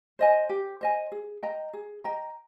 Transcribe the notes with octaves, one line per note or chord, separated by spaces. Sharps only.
C5 D#5 G#5
G4
C5 D#5 G#5
G#4
D#5 G5 A#5
G#4
D#5 G5 A#5